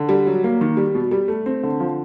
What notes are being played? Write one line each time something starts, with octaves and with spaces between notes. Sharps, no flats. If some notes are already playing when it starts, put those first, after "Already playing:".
Already playing: D3
G3
F#3
A#3
D#3
G3
B2
G3
A3
C4
D3
F3